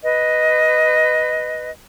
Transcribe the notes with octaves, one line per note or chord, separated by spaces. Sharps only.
B4 D#5